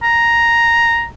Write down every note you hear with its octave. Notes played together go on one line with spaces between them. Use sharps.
A#5